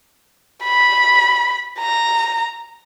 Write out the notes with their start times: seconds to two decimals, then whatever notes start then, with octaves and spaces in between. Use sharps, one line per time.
0.63 B5
1.79 A#5